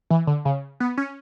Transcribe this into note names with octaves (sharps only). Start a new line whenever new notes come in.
E3
D3
C#3
B3
C#4